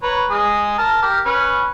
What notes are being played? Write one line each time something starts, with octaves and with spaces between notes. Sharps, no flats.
B4 C#5 A#5
G#3 G#4
A#4 A5 A#5
G4 A#4
C#4 B4